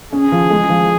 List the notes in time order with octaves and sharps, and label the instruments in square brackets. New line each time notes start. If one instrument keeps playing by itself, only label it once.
[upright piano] C#4 [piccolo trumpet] G#4
[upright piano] F3
G#3
F3